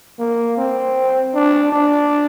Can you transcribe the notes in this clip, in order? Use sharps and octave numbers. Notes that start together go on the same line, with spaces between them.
A#3
C4
D4
D4